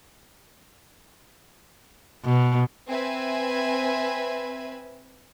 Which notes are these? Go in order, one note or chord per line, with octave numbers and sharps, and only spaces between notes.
B2
C4 B4 E5 G#5